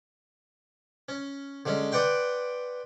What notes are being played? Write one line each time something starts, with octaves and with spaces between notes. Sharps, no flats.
C#4
D3 G#3 C#4
B4 D5 F#5 G5 C6